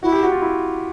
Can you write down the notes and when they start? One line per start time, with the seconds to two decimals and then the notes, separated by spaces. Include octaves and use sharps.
0.03 E4 F#4
0.12 G4
0.23 F#4
0.32 F4
0.42 E4